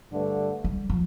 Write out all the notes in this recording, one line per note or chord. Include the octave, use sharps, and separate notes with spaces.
G2 D3 A3
G3
F3